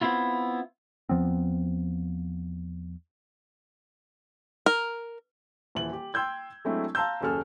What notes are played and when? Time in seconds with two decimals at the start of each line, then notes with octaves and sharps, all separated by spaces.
0.01 B3 C4 E4 F4
1.09 E2 F3 B3 C4
4.66 A#4
5.75 D#1 E3 F#7
5.93 G4
6.14 G5 C6 E6 G6 G#6
6.65 F#3 G#3 A3 C4 D4 E4
6.95 F5 A5 A#5 C6 E6 G6
7.21 F#1 D#2 C#4 G#4 A4 F6